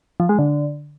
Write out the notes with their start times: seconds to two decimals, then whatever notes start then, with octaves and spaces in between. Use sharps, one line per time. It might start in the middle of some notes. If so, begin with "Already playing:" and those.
0.20 F3
0.29 G#3
0.39 D3